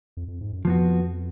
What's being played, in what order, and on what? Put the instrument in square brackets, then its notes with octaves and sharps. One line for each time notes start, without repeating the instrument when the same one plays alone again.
[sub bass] F2
F2
G#2
F#2
[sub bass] F2 [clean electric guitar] F3 B3 F#4